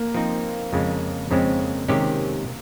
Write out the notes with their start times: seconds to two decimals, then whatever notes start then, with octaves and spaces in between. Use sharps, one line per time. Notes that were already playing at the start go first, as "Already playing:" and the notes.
Already playing: A#3
0.14 F3 C4 D#4
0.73 F2 C#3 G#3
1.31 F2 C#3 G#3 C4
1.89 C3 D#3 G#3 C#4 G4